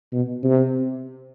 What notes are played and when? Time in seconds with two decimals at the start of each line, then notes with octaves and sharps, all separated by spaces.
0.12 B2
0.43 C3